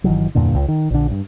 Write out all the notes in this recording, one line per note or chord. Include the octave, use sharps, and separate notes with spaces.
G1 D#3 E3 F#3
E2 G2 A#2 D3
C#2
D#3
A#1 D3
G2